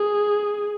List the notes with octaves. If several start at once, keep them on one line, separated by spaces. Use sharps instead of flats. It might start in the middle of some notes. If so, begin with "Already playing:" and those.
Already playing: G#4